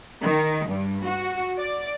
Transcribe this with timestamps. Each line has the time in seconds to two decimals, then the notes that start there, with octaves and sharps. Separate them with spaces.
0.23 D#3
0.67 G2
1.05 F#4
1.60 D5